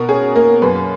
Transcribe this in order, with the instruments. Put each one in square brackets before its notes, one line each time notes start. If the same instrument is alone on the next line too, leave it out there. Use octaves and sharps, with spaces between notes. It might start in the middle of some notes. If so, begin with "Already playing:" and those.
Already playing: [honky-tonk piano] B2 A#4
C#4 G#4
A#3 A#4
F#2 B4